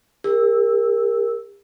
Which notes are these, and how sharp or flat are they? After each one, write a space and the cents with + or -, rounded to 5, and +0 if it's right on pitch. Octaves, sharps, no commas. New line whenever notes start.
G4 +40 A#4 +0 E6 +0